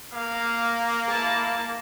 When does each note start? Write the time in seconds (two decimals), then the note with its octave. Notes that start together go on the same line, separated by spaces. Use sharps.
0.13 A#3 F5
1.09 E4 A5